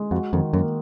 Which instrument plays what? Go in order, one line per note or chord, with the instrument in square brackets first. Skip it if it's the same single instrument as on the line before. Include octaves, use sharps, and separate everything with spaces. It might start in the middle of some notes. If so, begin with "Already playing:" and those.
Already playing: [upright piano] G#3
[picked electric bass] F2 [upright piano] F#4
[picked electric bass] F2 [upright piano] D#3
[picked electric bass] F#2 [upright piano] A#3